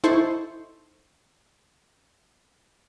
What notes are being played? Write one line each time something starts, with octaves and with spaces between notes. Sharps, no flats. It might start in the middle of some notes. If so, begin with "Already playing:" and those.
D#4 E4 A4 C5 C6 C#6